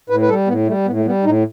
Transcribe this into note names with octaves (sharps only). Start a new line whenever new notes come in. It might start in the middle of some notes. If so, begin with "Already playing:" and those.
A2 B4
B4
G3 A4
A2 B3
G3 A3
A2 B3
A3
G3 B3
A2 D#4